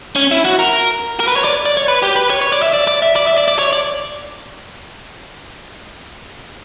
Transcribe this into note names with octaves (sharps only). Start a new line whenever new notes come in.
C#4
E4
F#4
A#4
A#4
B4
C#5
D5
D5
C#5
B4
G4
B4
C#5
C#5
D5
E5
D5
D5
E5
D5
E5
D5
D5
C#5
D5